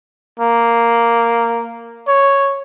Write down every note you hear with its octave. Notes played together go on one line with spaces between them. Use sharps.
A#3
C#5